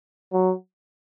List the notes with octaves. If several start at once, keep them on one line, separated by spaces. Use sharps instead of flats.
F#3